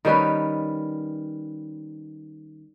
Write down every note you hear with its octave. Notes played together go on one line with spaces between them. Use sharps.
D#3 G3 C#4 B4